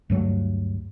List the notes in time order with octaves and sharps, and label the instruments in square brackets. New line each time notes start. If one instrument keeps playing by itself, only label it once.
[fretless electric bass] D2 G2 F#3